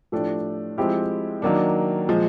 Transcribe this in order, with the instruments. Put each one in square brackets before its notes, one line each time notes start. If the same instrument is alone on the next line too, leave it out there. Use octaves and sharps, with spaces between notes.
[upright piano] A2 F3 A3 D4 G4
F3 G#3 C4 E4 G4
D#3 F#3 A#3 D4
A#2 F3 G#3